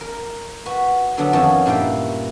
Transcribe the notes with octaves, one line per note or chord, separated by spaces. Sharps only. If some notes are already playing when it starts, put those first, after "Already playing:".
A#4
F#4 B4
D3 F#3 B3 D4
F2 D#3 B3 C#4 C#5 A5
G2 A#2 A#3 E4 G5